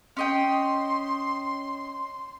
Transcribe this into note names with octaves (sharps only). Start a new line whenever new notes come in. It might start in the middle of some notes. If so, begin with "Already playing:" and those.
C#4 D#5 G5 C6